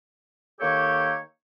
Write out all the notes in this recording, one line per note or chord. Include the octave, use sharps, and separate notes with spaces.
D#3 A#3 G4 A4 C#5